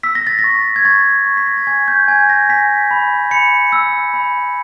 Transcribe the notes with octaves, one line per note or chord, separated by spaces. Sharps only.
E6 B6
A#6
A6
A#6
C#6
G#6
C#6 A6
C#6
B6
A#6
A6
G#5 G#6
G6
G#5 G#6
A#6
G#5 B6
B5
B5 C#7
E6
B5